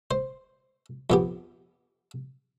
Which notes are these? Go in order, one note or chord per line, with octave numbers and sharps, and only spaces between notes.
C5
F2 B3 G4